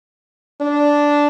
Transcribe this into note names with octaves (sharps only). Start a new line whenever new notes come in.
D4